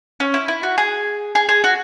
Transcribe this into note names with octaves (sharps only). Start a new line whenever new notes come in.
C#4
E4
E4
F#4
G#4
G#4
G#4
F#4